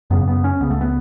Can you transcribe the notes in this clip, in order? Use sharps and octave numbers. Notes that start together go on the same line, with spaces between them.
F#2 C#3 B3
B3
C#4
C#2 C#3 B3
A3
B3